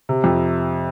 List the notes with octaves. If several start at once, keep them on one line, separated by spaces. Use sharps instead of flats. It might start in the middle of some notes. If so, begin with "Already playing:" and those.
C3
F2